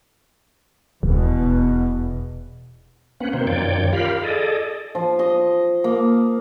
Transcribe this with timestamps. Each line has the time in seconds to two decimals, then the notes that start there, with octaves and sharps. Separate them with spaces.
1.03 D#1 E2 B2
3.20 A#3 C4 C#4 B4 F#5
3.33 B2 D#3 A#3 C4 C5
3.47 F#2 D#3 F3 C#5 D5 G5
3.93 F4 G4 A#4 F5 B5
4.23 G#4 A4 D5 D#5
4.95 F3
5.19 D#5
5.84 A#3